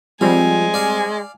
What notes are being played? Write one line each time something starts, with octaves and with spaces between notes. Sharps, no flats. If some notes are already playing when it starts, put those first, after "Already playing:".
F3 G3 G#3 C4 G#5
D5 F5